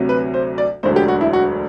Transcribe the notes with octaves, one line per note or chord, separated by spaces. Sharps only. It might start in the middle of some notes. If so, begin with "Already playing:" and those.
Already playing: D2 C3 F#3
B4
C5
D5
E1 D2 D3 F#3 C5
G4
F#4
E4
F#4